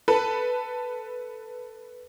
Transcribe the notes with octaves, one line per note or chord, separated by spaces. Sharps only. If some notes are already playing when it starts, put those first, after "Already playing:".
A4 B4